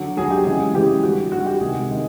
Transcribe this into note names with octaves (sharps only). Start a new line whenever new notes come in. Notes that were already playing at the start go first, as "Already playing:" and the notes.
Already playing: D3 F#3
D3 F#3 G#4
G4
C#3 E3 G#3 G#4
C#3 E3 G#3 G4
D3 G3 F#4
D3 G3 F#4
G4
C3 D#3 G#3 G#4
C3 D#3 G#3